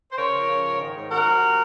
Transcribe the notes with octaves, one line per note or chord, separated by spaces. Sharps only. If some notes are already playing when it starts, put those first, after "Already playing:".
C5
C#3 A#4 C#5
F3
C#3
G#2
D#3
G#2
C#4 F#4 A#4
F3
C3